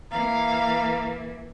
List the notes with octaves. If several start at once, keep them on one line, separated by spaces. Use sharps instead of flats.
E3 A#3 F5 A#5